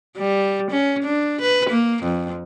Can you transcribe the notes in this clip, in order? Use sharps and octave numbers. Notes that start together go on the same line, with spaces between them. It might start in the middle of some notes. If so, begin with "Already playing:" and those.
G3
C#4
D4
B4
A#3
F2